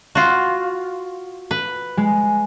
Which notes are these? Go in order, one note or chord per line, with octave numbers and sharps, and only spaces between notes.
F4 F#4
B4
G#3